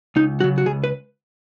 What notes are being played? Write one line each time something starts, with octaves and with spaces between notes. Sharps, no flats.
C#2 D#4
C#3 F#3 F#4
F#4
C#2 G#4
B4